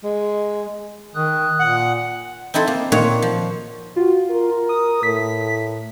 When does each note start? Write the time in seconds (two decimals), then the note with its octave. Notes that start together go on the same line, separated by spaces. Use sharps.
0.04 G#3
1.15 D#3 D#6 F#6
1.60 A#2 F#5
2.54 C4 D#4 E4 A4 C5
2.67 A#3
2.92 A#2 D#3 A#3 F#4 C#5 F#5
3.22 F3
3.96 F4 F#4
4.31 A#4
4.69 D#6
5.03 A2 B6